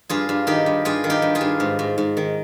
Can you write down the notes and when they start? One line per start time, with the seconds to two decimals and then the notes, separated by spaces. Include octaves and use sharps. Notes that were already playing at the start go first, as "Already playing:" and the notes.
0.09 G2 F4 G#4
0.29 G2
0.47 D#3 D#4 G4
0.66 G2
0.85 G2 F4 G#4
1.04 D#3
1.10 D#4 G4
1.22 G2
1.35 F4 G#4
1.41 G2
1.60 G#2
1.79 G#2
1.98 G#2
2.17 D#3